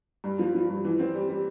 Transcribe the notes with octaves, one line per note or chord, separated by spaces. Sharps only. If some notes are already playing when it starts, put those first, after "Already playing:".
G2
F3
F3
G2
E3
C4
G3
G3